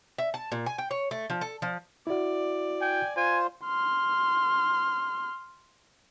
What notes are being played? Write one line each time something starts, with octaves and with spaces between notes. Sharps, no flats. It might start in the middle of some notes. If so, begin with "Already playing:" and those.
E5
A5
A#2
G#5
G5
C#5
A3
F3
A4
F3
E4 F#4 D5
G5 G#5
F4 C5 G#5
C6 F6